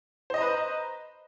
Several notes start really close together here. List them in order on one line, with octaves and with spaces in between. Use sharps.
C5 D#5 A#5 B4